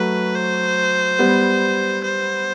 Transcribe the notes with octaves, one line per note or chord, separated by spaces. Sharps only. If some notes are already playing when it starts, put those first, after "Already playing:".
Already playing: F#3 A3 B4
C5
G3 B3
C5